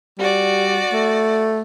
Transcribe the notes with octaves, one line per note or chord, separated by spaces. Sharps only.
G3 F#4 D5
A3